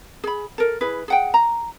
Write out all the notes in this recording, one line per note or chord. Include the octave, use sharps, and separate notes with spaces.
G#4 B5
A4 A#4
E4 G#4 B4
G#4 F#5 G5
A#5